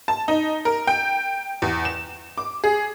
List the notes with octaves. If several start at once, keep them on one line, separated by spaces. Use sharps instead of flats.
A5
D#4
A#4
G5
E2
E7
D6
G#4